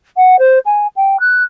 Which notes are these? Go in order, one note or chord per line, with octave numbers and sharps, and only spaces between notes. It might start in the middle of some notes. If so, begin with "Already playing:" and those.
F#5
C5
G#5
G5
F#6